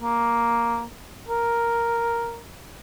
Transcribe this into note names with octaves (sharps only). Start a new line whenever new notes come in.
A#3
A#4